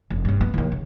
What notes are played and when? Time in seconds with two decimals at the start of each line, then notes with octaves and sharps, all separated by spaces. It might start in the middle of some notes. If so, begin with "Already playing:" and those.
0.10 F1
0.25 G2 C#4
0.41 B3
0.54 D#2 D#3
0.72 C#3